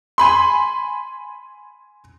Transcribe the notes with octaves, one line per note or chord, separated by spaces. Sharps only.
G#5 B5 C6